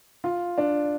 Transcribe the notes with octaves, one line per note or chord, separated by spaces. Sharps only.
F4
D4